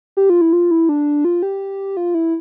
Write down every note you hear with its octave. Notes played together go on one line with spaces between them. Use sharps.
G4
F4
E4
F4
E4
D4
F4
G4
F4
E4